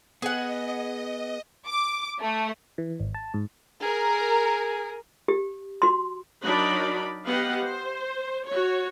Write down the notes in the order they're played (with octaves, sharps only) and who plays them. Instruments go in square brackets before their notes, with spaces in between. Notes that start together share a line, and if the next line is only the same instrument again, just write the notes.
[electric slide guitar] B3 [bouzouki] G#4 F#5 [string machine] D#5
[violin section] D6
A3
[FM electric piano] E3
G#1
A5
G#2
[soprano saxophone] G#4 [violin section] A#4
[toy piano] G4
F#4 C6
[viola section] F#3 D4 D#4 A#4 D5 B5
B3 G4 B4 D#5 F5 F#5
C5
F#4 C#5